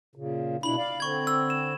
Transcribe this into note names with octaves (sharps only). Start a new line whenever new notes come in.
A#2 C#3
B2 D4 E4 B5 F#7
D5 F5
D3 C4 C#6 G#6
E6
E7